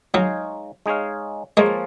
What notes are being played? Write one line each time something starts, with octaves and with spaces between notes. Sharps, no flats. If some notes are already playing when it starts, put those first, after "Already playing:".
F#3 G#3 D#4 G#4 C#5 F5
G#3 D#4 G#4 C#5 F5
F3 G#3 A#3 F4 G#4 C#5